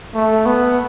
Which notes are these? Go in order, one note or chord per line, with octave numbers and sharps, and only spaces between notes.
A3
B3